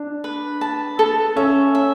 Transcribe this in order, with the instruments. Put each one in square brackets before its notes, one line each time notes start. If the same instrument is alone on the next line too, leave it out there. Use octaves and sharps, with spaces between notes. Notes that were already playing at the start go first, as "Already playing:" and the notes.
Already playing: [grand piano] D4
[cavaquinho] B4
A5
A4
[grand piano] C#4 [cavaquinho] E5
[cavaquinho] E5